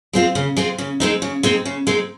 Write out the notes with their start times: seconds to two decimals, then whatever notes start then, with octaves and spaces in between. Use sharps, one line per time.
0.13 G#3 C4 F4
0.35 C#3
0.57 G#3 C4 F4
0.78 C#3
1.00 G#3 C4 D#4
1.22 C#3
1.43 G#3 C4 D#4
1.65 C#3
1.87 G#3 C4 D#4